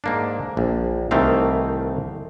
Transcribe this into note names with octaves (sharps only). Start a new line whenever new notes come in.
G#2 A#3 D4
A#1
C2 D#3 E3 A3 C4 F5